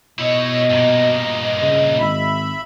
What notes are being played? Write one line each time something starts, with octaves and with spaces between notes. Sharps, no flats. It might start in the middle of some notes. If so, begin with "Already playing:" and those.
B2 E4 C#5 D#5
G2 A#2
C#3
G#1 E5 B5